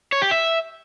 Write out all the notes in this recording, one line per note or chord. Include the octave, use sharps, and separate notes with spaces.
C#5
G4
E5